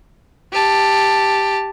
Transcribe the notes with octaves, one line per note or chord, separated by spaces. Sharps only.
G4 A5